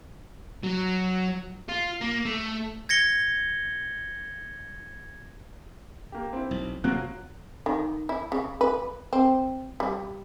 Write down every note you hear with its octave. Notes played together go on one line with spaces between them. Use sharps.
F#3
F4
A#3
A3
G#6 A#6 C#7 G7
A#3 G4
C4 E4
B1
C3 F#3 A#3 C4 F4 F#6
D#3
E4
C#3
B4
C4
G3